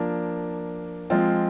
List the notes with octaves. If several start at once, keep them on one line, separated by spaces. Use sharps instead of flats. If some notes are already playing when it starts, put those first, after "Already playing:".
Already playing: F3 A#3 D4
F3 G#3 C4 F4